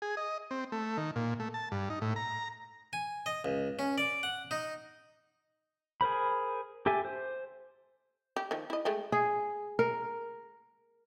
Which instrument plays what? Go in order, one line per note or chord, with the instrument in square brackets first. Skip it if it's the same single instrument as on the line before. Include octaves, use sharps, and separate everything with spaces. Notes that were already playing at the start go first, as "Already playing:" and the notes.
[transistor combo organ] G#4
D#5
C4
A3
D#3
A#2
A3
A5
G2
D#4
A2
A#5
[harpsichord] G#5
D#5
C#2
C#4
D5
F#5
D#4
[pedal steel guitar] G#4 A#4 C5 B5
G4 A4 E5 G#5
C5
[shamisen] G4
D#3 F3
E4 D#5
G#3 A3 G5
[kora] G#4
A#4